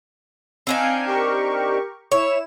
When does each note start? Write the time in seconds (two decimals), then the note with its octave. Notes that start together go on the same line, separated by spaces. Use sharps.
0.67 C4 D4 D#4 F5 G#5
1.05 G4 A#4 C#6
2.12 E4 C#5 E7